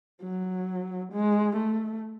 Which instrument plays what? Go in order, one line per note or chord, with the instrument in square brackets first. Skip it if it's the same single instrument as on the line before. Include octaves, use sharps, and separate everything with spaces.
[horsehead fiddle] F#3
G#3
A3